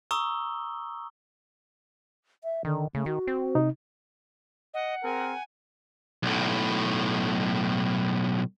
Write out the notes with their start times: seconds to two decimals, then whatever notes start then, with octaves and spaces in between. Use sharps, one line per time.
0.11 A#5 C#6 D#6 E6 G7
2.44 E5
2.65 D3 D#3
2.95 C#3 A3
3.06 D#3 F#4
3.27 C4
3.55 C3 D#4
4.74 D#5 F#5
5.04 C4 G#4 A#4 G#5
6.23 B1 A2